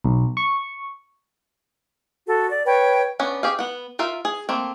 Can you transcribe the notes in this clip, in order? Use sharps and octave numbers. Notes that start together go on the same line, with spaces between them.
B1
C#6
F#4 A4
D5
B4 C#5 G5
B3 C#4 D4
G4 G#4 F5
B3 F#5
F4 A#4 E5 F5
G#4
A3 A#3 C4